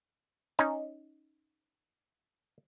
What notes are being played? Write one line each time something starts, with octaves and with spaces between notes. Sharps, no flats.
C#4 D#4